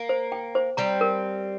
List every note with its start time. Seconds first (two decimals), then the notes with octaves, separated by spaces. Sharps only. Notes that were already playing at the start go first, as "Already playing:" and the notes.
Already playing: A#3
0.09 C5
0.32 G5
0.55 C5
0.77 G3 C4 A#5
1.01 A#4